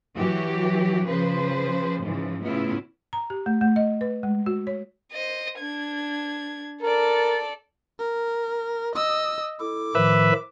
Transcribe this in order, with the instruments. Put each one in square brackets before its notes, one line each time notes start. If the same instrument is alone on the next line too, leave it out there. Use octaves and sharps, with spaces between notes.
[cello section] E3 F#3 F#4 G4
C#3 F3 B4 C5
G#2 C#3 E3 F3
A2 C#3 B3 E4 F4
[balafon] A#5
G4
A3
A3
D#5
B4
G#3
F#4
C#5
[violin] C5 D#5
D4 G#6
[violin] A4 D5 [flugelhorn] A#4
[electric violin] A#4
D#5 E6
[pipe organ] E4 A4 [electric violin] D6
[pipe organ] A2 D#3 F3 [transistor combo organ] B4 E5